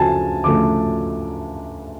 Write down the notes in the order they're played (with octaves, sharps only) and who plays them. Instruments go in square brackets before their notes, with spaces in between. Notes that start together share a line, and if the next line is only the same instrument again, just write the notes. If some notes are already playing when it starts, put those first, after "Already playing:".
Already playing: [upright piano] D2 C#3 F3 A3 G#5 A5
D2 C#3 F3 A3 D6